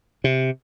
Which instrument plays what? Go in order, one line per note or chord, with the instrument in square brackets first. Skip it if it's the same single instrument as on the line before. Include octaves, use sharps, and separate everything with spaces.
[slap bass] C3